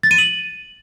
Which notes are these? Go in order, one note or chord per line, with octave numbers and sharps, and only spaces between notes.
A6
D#7
F#7